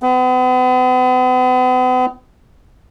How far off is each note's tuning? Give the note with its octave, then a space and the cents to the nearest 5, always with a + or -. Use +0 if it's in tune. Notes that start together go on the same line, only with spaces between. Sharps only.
B3 +40